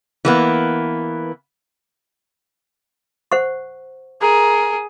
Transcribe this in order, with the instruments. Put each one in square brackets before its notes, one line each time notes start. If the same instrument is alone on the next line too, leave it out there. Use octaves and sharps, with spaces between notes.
[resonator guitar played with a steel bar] E3 A#3 B3
[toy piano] C5 F#5 C#6
[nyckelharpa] G#4 [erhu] A#4